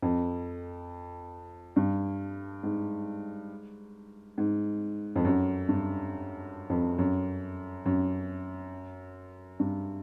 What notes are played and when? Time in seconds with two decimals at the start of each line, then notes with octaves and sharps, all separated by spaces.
0.02 F2
1.76 G2
2.63 G#2
4.38 G#2
5.16 F2
5.25 F#2
5.68 G2
6.70 F2
6.98 F#2
7.86 F#2
9.59 G2